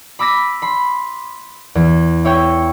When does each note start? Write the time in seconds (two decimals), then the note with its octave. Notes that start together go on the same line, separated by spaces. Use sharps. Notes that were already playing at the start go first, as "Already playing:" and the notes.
0.19 B5 D6 E6 A#6 B6 D#7
0.62 B5 C6
1.75 E2
2.25 E4 C#5 G5 E6